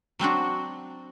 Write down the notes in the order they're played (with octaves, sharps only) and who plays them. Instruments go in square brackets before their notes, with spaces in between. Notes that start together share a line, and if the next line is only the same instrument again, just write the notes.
[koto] F#3 C4 D4 F#4